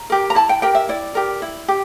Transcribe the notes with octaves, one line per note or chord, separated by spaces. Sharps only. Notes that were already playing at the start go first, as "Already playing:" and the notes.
Already playing: A#5
G4 A#4
A#5
E4 A5
G5
G4 A#4 G5
E5
E4 D5
G4 A#4
E4
G4